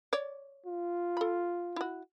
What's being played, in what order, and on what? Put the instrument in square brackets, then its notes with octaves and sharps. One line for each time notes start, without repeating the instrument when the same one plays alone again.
[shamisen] C#5 D5
[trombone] F4
[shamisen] A4 B5
E4 F#4